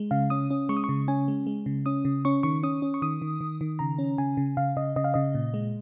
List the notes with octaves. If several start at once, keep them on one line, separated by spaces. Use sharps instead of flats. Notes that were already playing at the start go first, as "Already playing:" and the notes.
Already playing: G#3
C#3 F5
C#4 D#6
C#4
G#3 C#6
D#6
C#6
C#3
C#4 G#5
G#3
G#3
C#3
C#4 D#6
C#3
C#4 C#6
D#3 C#6
C#4 D#6
C#4
C#6
D#3 D#6
D#3
D#3
D#3
C#3 A#5
C#4
C#3 G#5
C#3
C#3 F5
C#3 D#5
C#3 D#5
F5
C#3 D#5
A#2
G#3